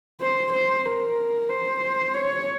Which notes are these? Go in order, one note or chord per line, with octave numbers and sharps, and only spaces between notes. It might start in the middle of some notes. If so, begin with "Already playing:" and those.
C5
C5
A#4
C5
C#5